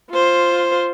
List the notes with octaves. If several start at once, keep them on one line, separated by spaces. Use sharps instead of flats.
F4 C5